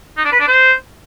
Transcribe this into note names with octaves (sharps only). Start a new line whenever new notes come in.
D#4
D4
B4
D4
C5